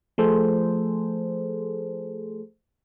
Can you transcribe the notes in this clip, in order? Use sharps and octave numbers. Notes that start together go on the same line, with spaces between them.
F3 A3 G#4 A4 C5